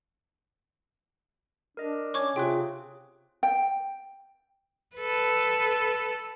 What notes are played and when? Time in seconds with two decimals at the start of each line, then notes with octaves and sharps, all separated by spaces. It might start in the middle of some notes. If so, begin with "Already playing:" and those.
1.77 D4 A#4 D#5
2.14 C#4 C#6 D6 G#6
2.36 C3 F4 G#4 G5 F#6
3.43 G5
4.96 A4 B4